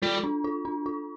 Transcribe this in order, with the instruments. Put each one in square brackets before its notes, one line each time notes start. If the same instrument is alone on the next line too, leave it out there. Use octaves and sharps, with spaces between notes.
[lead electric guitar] G3 [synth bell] F4
[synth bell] F4
D4
F4
D4
F4